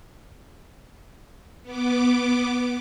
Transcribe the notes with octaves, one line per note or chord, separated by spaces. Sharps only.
B3 D6